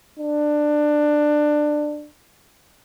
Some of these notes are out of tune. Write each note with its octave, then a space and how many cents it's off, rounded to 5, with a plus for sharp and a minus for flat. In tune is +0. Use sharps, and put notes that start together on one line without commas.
D4 +20